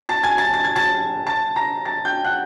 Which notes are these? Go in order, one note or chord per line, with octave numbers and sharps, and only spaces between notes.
A5 A6
G#5 G#6
A5 A6
A6
G#6
A5 A6
A5 A6
A#5 A#6
A5 A6
G5 G6
F#5 F#6